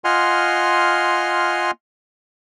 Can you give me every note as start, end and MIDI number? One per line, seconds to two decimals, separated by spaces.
0.04 1.71 65
0.04 1.71 75
0.04 1.71 78
0.04 1.71 80
0.04 1.71 84
0.04 1.71 89